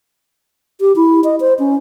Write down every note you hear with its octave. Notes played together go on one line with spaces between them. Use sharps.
G4
E4
D#5
C5
C#4